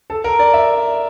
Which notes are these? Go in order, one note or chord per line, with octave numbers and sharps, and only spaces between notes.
A4
A#4
D5
E5